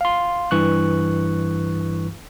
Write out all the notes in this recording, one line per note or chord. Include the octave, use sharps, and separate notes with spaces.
F5 C6
G2 E3 C#6 F#6